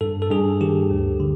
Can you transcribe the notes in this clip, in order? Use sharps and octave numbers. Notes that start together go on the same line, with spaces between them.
G2 A4
A4
G2 G#4
D#3 G4
D2
D3